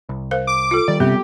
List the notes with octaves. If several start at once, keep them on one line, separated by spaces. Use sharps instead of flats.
C2
A#4 C5 F5
D6
F4 A4
D#3 G3 D5
C3 G3 B3 G4